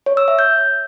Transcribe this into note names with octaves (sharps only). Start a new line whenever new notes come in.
C#5
E6
E5
G6